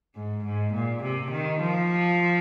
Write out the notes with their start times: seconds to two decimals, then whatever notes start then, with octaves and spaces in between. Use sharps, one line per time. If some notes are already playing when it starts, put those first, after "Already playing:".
0.15 G#2
0.45 G#2
0.74 A#2
1.03 C3
1.31 D#3
1.61 F3